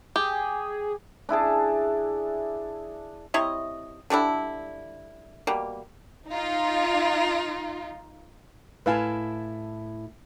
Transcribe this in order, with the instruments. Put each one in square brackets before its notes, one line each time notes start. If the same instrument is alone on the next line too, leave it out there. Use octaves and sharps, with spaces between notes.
[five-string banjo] G4 [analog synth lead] G#4
[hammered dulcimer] D4 E4 G#4 A5
[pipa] C3 E4 C#5 D#5
D3 G3 D4 E4
B2 G3 A#3
[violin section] D#4 F4
[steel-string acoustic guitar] A2 E4 A5 [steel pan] B4 F5 G#5